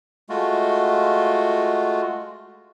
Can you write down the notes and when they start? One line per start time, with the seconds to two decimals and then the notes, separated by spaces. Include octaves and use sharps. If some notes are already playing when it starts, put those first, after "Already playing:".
0.29 G#3 A3 F4 F#4